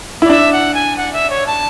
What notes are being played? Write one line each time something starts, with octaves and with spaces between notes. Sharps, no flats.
E4
D5
D4 E5
F#5
G#5
F#5
E5
C#5
A5